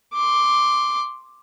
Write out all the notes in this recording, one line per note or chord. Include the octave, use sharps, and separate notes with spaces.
C6 D6